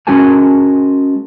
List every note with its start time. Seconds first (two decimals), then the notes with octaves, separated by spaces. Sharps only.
0.07 G#3 C#4 F#4 A#4 G#5 A5